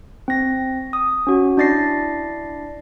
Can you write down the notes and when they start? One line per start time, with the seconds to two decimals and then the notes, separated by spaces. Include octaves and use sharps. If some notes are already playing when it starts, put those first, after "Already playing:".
0.28 C4 A#6
0.93 D#6
1.27 C#4 F#4
1.57 D4 E4 D5 A6 A#6 C7